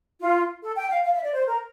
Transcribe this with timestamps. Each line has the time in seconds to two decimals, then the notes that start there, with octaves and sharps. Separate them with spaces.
0.21 F4
0.62 A4
0.76 G5
0.90 F5
1.04 F5
1.14 E5
1.23 D5
1.33 C5
1.47 A#4